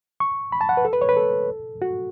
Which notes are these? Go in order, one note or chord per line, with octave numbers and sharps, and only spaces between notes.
C#6
B5
A5
F#5
B4
A4
B4
C#5
B4
A4
F#4